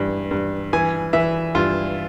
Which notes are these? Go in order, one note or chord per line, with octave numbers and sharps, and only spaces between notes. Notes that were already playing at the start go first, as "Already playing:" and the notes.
Already playing: G2 E3
G2
E3 G#5
E3 E5
G2 F4